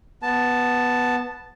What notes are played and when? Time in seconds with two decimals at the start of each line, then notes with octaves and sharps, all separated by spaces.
0.23 B3 A5